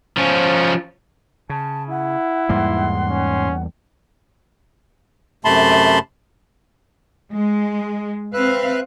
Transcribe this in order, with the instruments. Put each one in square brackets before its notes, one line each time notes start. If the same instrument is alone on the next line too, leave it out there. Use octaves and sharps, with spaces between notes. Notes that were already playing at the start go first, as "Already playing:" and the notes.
[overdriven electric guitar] F3 C#4
[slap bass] C#3 [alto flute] A5
[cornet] E4 [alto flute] F#5
[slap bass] E2 G3 A#3 [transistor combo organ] G#2 C6
[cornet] C#4
[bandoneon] F#2 C3 A3 A5 B5 C6
[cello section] G#3
[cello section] C4 F5 [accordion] B4 E5 F#6